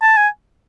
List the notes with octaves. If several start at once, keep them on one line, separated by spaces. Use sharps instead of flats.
A5
G#5